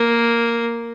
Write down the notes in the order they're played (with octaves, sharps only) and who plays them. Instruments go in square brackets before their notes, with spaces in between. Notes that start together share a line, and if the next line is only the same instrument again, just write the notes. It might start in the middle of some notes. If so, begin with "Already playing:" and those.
Already playing: [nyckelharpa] A#3